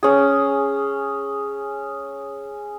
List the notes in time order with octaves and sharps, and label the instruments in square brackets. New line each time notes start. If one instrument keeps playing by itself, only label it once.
[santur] C#4 G#4